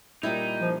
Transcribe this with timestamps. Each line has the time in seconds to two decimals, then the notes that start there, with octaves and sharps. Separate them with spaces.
0.23 A#2 G3 D#4 E4
0.60 F3